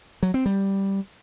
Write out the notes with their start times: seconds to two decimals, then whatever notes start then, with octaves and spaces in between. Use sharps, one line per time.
0.23 F#3
0.34 C4
0.46 G3